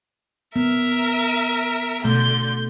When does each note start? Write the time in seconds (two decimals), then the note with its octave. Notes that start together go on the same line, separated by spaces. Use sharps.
0.56 B3 A#4 E5
2.04 B2 D3 A3 C6 G6